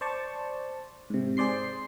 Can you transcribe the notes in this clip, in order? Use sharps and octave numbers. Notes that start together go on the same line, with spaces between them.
C5 D5 A5 C#6
G#2 C3
G#4 C5 D5 C6 C7